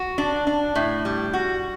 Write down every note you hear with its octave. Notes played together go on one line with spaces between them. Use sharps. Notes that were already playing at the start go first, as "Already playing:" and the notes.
Already playing: F#4
D4
D4
A2
G3
F#4